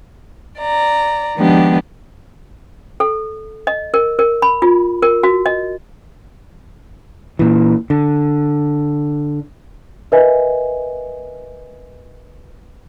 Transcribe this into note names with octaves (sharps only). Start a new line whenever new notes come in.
D5 A#5
D#3 F3 G#3 B3 D4 G4
A4
D#5
A#4
A#4
B5
F4
A#4
F#4
D#5
A#2 E3
D3
A#4 B4 D#5 E5 G#5